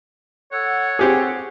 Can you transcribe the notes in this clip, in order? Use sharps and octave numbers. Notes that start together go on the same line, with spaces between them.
A4 C#5 F#5
C4 G4 G#4